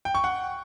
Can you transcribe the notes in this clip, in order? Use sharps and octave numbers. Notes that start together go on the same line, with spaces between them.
G5
C#6
F#5